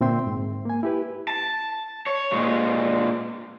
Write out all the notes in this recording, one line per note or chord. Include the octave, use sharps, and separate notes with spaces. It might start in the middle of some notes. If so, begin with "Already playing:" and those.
A#2 D3 C4 E5 G5 C6
G#2
A#3 G#5
E4 G4 B4
A5
C#5
A#2 G#3